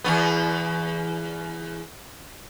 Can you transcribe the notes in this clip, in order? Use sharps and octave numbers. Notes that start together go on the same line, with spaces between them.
E2 G2 B3